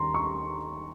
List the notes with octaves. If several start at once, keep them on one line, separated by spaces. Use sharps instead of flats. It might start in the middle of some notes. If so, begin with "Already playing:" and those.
Already playing: D#2 D#3 G3 A#5 C6
C#6